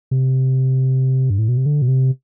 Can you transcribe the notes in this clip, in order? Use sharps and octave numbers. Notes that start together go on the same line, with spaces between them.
C3
G2
A2
B2
C3
D3
B2
C3